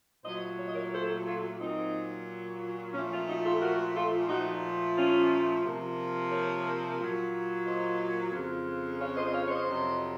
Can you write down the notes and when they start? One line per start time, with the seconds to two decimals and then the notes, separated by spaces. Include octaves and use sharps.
0.25 A#2 F#3 A3 C5 D#5
0.58 C#5
0.67 D#5
0.74 A#4 C#5
0.92 A4 C5
1.25 F4 A4
1.59 A#2 F#3 A#3 C4 D#4
2.93 A#2 F3 A3 C#4
3.10 C#4 F4
3.27 D#4 F#4
3.44 F4 A4
3.60 F#4 A#4
3.95 F4 A4
4.28 A#2 F3 A3 D#4 F#4
4.96 C#4 F4
5.63 C3 F3 A#3
6.30 A#4 C#5
6.97 A#2 F#3 A#3
7.65 C5 D#5
8.31 F2 C#3 F3
8.99 C#5 F5
9.16 C5 D#5
9.27 D#5
9.32 C#5 F5
9.46 C#5
9.49 C5 D#5
9.67 F2 C3 F#3